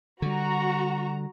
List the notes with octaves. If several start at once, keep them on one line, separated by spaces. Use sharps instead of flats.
D3 G3 F#4 A#5